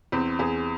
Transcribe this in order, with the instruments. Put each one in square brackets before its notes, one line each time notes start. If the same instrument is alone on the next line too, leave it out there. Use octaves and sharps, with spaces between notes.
[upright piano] E2 C4
E2 G#4